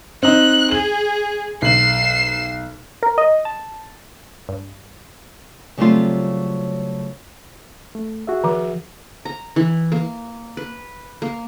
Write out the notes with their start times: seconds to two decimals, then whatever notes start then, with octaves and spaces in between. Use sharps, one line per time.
0.23 C4 D#4 F#6
0.71 G#4 F#7
1.62 B1 C7 E7 F#7
3.03 A#4
3.18 D#5
3.45 A5
4.49 G2
5.78 C#3 F#3 G3 A3 C4 F4
7.95 A3
8.27 F#4 G#4 E5
8.44 D#3 F3
9.25 A#5
9.56 E3
9.92 A#3
10.57 B4
11.22 A#3